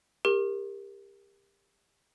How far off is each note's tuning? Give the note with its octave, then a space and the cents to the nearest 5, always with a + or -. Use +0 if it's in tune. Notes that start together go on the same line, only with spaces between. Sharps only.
G4 +25 A#4 +0 C6 +45